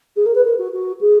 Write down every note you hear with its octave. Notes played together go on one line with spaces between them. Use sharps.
G#4
A#4
B4
A#4
F#4
F#4
G#4